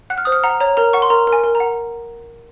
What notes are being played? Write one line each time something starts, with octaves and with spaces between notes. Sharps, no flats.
F#5 F#6
F6
C5 D#6
F6
F#5 A#5
C#5 A#5
A#4 A#5
F#5 C#6
C6
A#4 A#5
A#4
G#5
A#4
A#5
F#5